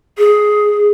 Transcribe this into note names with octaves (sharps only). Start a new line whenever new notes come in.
G#4